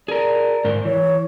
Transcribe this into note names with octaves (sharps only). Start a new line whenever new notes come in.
G#4 A#4 D5
G#2 A#4 C5
E3 C#5